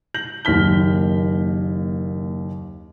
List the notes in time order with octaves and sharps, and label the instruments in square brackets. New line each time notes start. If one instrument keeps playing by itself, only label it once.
[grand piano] G6 A#6 F#7
F#1 D#2 F6 B6 G7